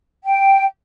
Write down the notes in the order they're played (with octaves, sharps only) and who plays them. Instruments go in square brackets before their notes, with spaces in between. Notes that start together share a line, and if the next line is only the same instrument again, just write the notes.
[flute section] G5